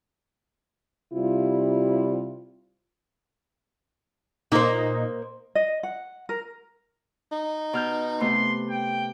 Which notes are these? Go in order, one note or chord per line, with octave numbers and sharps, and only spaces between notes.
C3 G3 E4 F4
A#2 A#3 D#4 C5
D#5
F#5
A#4
D#4
B2 F6 G6
C3 A3 B3 C6
G5